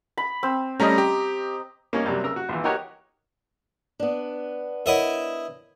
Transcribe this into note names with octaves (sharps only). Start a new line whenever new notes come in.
B5
C4
G3 A3 C#4 D#5 A#5
G4
A#3 C#4 D#4
C3 F#3 G3 A#3
C#3 A#4 A#5 E6
F#4
A#1 E3
D#4 F#4 G4 A#4 C#5 F#5
B3 D4
E4 A#4 C#5 D#5 E5 F#5